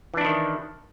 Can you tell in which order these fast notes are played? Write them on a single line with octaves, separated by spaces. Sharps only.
E3 D4 E4 D#3